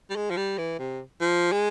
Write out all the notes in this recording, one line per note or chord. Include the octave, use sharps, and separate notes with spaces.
G3
G#3
F3
G3
E3
C3
F3
G#3